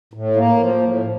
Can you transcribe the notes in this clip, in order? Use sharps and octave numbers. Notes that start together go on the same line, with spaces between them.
A2
A#3
F3
A2